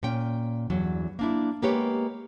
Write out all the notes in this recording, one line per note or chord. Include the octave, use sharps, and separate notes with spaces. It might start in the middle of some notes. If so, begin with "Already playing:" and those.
A#2 C#4 G5
E2 G2 F#3
A#3 D4 E4
G#3 A#3 B3 G4 B4 C#5